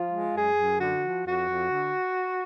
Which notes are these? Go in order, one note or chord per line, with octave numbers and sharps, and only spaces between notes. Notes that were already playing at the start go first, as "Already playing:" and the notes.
Already playing: F3 F4
G#3
F#2 G#4
F#2
D3 F#4
F3
F2 F#4
F2
D3